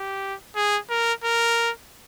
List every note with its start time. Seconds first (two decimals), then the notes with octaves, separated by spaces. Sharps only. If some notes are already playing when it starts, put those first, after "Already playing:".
Already playing: G4
0.55 G#4
0.90 A#4
1.24 A#4